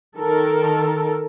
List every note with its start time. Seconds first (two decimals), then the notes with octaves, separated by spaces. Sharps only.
0.19 D#3 A4 A#4